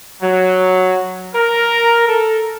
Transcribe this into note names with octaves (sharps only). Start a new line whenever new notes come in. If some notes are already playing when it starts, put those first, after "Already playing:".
F#3
A#4
A4